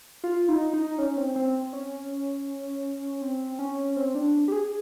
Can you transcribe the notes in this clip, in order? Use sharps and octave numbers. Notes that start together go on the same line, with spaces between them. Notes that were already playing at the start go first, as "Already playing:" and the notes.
F4
D#4
D#4
C#4
C4
C4
C#4
C4
C#4
C4
D4
G4
G#4